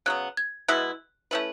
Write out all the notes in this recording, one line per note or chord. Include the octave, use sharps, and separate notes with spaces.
C#3 F#3 B3 F#6
G#6
B2 G#3 B3 E4 F#6
A3 C#4 E4 B4